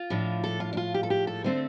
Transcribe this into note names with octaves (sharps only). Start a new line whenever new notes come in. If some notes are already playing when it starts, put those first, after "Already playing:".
Already playing: F4
A2 F3 D4
A4
F4
D4
F4
G4
A4
G4
A4
D3 A3 C4 C5